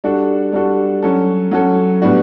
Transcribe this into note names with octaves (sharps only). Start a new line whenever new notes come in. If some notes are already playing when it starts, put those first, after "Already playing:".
G3 D4 F#4 A4
G3 D4 F#4 A4
F#3 C#4 F#4 A4
F#3 C#4 F#4 A4
A2 G3 B3 D4 F#4